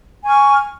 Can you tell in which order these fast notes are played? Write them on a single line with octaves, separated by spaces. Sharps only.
G#5 C#6 F6